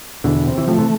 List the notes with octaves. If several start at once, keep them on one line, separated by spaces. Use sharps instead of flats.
E2 B2 D3
C3
E3
F3 A3
C3 E3